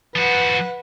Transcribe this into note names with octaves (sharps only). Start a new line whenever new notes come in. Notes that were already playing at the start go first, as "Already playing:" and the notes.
F3 F#4 B4 F#5